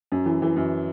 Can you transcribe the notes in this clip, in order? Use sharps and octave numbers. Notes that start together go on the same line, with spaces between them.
F#2
E3
E3
F#2